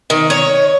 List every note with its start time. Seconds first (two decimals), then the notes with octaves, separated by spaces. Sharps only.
0.10 D#3
0.30 C#5